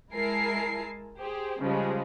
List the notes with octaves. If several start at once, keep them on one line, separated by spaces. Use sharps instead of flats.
G#3 E4 A#4 G#5 A5 C7
G4 G#4 C5
C#3 F3 G3 G#3